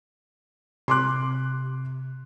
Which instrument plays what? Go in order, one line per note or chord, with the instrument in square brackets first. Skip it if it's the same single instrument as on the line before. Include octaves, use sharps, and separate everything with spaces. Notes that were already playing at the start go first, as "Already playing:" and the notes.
[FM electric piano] C3 [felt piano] C6 D6 F#6